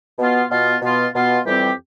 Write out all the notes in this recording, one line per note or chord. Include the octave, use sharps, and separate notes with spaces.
B2 B3 F4
B2 B3 F4
B2 B3 F4
B2 B3 F4
F2 E3 G3 C4 G4